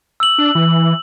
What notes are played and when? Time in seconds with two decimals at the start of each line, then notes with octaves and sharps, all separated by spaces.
0.20 E6 F#7
0.38 D4
0.55 E3